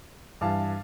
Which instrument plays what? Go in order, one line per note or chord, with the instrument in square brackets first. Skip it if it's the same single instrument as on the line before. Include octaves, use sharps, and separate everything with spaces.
[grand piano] G2 E3 F5 A5